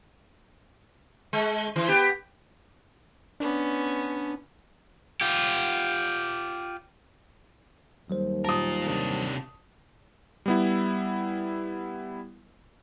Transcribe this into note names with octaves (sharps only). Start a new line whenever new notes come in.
G#3
E3
B3 G4
B3 C#4 D4
F4 G4
D#2 F#3 G3 C5
F4 A#4 A5 D#6
C3 D4
G3 B3 E4